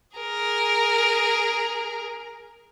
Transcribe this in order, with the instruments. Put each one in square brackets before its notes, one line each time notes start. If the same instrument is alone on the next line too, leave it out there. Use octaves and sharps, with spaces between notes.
[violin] G#4 A#4